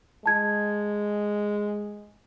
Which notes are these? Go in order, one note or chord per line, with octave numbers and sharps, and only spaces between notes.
G#3 A5 G#6